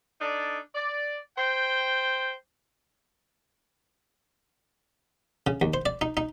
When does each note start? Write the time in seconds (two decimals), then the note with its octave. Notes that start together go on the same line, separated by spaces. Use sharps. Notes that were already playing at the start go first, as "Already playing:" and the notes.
0.21 D4 D#4 A4 D5
0.75 D5
1.38 C5 G5
5.47 C#3
5.61 D#2
5.74 C5
5.86 D5
6.01 D#4
6.17 D#4